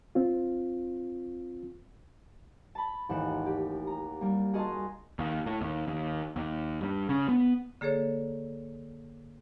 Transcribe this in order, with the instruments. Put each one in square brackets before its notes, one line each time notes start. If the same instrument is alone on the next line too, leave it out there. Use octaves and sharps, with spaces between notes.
[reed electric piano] C4 F4
[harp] A5 B5
A1 D#2 G#2 B4 F#5 E7
G4
A#5
G3 A#3
F#4 G#4 A#4 D#5 A5 C6
[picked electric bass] D#2
A2
D#2
D#2
D#2
G2
C#3
B3
[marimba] D3 A#3 G#4 A4 C#5